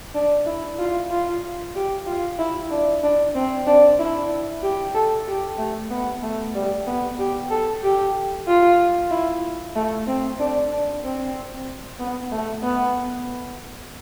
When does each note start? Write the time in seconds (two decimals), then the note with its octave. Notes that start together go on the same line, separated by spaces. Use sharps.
0.15 D4
0.46 E4
0.79 F4
1.11 F4
1.75 G4
2.06 F4
2.39 E4
2.71 D4
3.03 D4
3.35 C4
3.67 D4
3.99 E4
4.62 G4
4.94 A4
5.27 G4
5.58 A3
5.91 B3
6.23 A3
6.55 G3
6.87 B3
7.19 G4
7.51 A4
7.83 G4
8.47 F4
9.11 E4
9.76 A3
10.07 C4
10.39 D4
10.71 D4
11.03 C4
11.99 B3
12.31 A3
12.63 B3